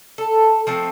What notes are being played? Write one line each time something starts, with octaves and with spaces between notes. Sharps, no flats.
A4
F3 A3 C4